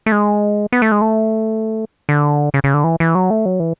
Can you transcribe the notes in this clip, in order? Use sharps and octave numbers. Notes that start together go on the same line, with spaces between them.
A3
G#3
B3
A3
G#3
A3
D3
C#3
C#3
D3
E3
E3
F#3
A3
F#3
E3